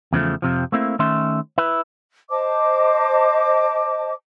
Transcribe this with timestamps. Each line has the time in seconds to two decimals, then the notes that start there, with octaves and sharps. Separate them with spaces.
0.13 E2 C#3 F3 A3
0.42 F2 C3 F3
0.72 A3 A#3 C4 E4
0.99 D#3 A3 C#4 E5 C6
1.58 E4 B4
2.30 C5 D#5 A5 D6